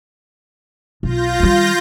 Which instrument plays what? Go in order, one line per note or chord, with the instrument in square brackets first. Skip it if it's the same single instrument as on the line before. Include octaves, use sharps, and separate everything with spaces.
[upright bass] B1 [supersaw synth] F4 G6 A#6
[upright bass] D#3 G3